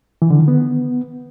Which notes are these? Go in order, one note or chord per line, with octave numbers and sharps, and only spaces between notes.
E3
D3
D#3
B3